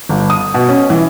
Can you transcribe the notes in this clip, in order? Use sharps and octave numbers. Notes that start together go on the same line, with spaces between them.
G1
D#6
B2
C#4
E3